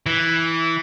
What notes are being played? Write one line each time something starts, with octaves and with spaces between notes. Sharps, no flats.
E3